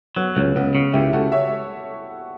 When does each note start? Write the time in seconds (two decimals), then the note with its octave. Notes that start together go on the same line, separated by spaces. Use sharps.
0.16 F#3 B3
0.36 C#2 C#4
0.56 C#2 B3
0.75 C#3
0.93 C#2 E4 G4
1.13 C#2 F#4 A4
1.32 C#5 E5